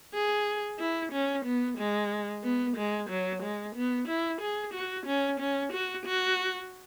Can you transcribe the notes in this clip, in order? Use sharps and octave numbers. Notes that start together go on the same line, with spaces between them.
G#4
E4
C#4
B3
G#3
B3
G#3
F#3
G#3
B3
E4
G#4
F#4
C#4
C#4
F#4
F#4